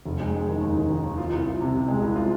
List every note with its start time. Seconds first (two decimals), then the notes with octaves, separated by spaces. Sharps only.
0.05 F1
0.20 G#3
0.34 G#3
0.48 D#3
0.61 D#2
0.76 D#3
0.89 D#3
1.04 D#2
1.18 F4
1.32 C2
1.46 F4
1.60 C3
1.73 C3
1.88 G#3
2.02 C2
2.16 F4